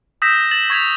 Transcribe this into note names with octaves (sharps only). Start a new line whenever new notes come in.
D#6 E6 G6 A#6 B6 E7
A6 E7 F#7
C#6 G#6 B6 F7